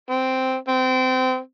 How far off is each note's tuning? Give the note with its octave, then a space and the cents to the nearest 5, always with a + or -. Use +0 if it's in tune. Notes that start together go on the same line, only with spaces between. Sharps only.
C4 -5
C4 -25